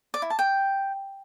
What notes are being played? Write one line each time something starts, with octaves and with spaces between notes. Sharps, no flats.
D5
E4
A5
G5